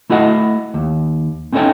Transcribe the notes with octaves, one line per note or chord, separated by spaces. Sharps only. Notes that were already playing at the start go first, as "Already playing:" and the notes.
A3 E4 F#4 D#5 F#5
D#2
C4 C#4 D#4 A4 C#5 G5